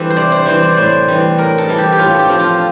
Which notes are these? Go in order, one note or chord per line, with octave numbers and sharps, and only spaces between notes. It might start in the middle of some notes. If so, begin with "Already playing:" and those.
Already playing: E3 G3 C4 G4 A4 E5
C5
C3 D5
C5
E3 G3 C4 C5
D5
A2 C5
E3 G3
A2 A#4
A4
E3 G3
G4
G4
A2 F4
G4 A4
F3 C4
F4